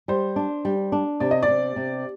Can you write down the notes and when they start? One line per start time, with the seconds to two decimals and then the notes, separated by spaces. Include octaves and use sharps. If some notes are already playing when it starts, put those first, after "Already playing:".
0.08 G3 C5
0.36 D4
0.65 G3
0.92 D4
1.20 C3 D5
1.31 D#5
1.43 D5
1.48 C3
1.76 C3